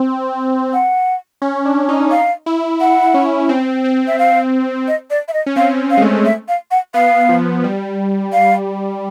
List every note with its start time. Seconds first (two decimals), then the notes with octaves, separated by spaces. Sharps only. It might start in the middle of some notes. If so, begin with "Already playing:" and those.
Already playing: C4
0.73 F#5
1.42 C#4
1.65 D4
1.89 D#4
2.11 D#4 F5
2.46 E4
2.80 E4 F#5
3.14 C#4
3.49 C4
3.84 C4
4.07 E5
4.19 F5
4.88 D#5
5.10 D5
5.28 E5
5.33 D#5
5.46 C#4
5.56 C4 F5
5.91 F5
5.97 G#3
6.02 A3
6.25 E5
6.48 F5
6.71 F#5
6.94 B3 F5
7.29 F3
7.64 G3
8.33 F5